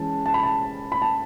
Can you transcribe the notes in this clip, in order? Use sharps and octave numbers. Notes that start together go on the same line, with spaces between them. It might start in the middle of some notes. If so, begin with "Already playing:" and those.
Already playing: E3 G#3 C#4 E4 A5
A5
B5
A5
B5
A5